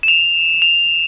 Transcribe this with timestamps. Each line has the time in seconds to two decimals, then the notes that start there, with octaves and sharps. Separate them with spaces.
0.03 E7
0.08 F7
0.62 F7